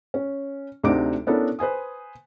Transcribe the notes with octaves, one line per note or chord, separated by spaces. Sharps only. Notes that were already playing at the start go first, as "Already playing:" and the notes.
C#4
D2 C3 D4 D#4 D6 D7
B3 C#4 D4 E4 A4 A#4
B4 C5 G#5 D#6